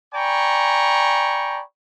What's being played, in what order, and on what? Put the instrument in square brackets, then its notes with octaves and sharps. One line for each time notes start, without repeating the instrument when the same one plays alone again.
[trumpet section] D5 G5 G#5 A#5 B5 C#6